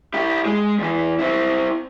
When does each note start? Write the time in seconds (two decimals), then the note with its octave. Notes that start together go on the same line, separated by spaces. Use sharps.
0.14 E4 G4
0.46 G#3
0.78 E2 E3
1.19 C4 E4